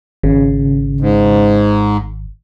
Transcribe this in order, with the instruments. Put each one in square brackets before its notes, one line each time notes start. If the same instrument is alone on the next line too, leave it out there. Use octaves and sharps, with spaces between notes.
[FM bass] G#1 [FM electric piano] C#3
[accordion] G#2